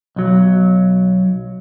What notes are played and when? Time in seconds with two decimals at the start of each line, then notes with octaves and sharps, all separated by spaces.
0.16 B1 F#3